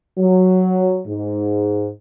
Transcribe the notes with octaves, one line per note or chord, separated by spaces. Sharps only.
F#3
G#2